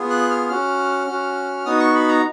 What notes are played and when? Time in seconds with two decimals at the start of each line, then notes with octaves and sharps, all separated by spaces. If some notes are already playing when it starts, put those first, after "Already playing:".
Already playing: B3 F4 G#4
0.10 F#6
0.30 F6
0.49 C#4 F#4 F6
1.07 C#4 F#4
1.65 B3 D#4 F#4 D#6
1.80 C#6
1.95 B5
2.08 A#5